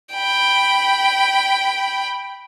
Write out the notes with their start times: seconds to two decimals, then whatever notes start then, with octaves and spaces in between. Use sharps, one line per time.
0.14 G5 B5